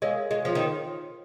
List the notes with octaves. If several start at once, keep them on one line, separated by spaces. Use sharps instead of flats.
G#3 A#4 C#5 F5 G#5
G#3
F3
D#3